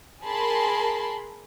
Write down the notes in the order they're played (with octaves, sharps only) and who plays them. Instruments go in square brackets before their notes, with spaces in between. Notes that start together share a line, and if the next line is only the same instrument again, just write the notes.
[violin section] G#4 A#4 A5 B5 C6